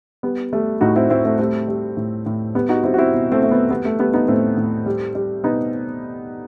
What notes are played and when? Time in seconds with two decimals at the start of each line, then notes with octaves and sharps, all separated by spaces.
0.23 G3 B3
0.53 G3 A3
0.81 A2 D#4 F#4
0.96 C4 E4
1.10 A2 C4 E4
1.25 A3 C4
1.39 G3 A3 C4
1.68 G3
1.97 A2
2.26 A2
2.55 G3 B3
2.69 D#4 F#4
2.83 G3 C4 E4
2.94 F#4
2.98 C4 E4
3.13 B2
3.32 A3 C4
3.42 B2 A3
3.51 B3
3.70 G3 B3
3.85 A3
3.99 G3 B3
4.13 B3 D#4
4.28 A2 A3 C4
4.57 A2
4.86 G3
5.15 G3
5.44 B2 B3 D#4